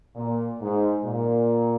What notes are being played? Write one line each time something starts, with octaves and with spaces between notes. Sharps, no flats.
A#2
G#2
A#2